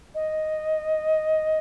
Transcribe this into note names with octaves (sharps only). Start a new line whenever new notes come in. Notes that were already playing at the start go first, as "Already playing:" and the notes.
D#5